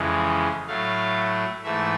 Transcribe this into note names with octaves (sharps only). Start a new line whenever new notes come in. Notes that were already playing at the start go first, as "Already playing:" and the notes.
Already playing: F2 C#3 E3 G#3
A2 F#3 A3 F5
G#2 E3 A3 E5